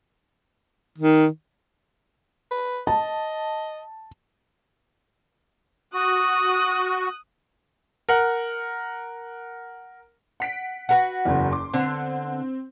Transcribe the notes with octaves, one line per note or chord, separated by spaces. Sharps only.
D#3
B4
D#5 A5
F#4 D#6 F#6
A#4 F#5
F#5 B6 D7
F#4 A#4 B4
F#1 E2
C6 D6
D3 B3 C4